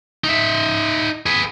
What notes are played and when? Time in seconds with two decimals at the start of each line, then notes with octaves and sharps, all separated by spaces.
0.24 D#4 E5
1.26 G#4 B4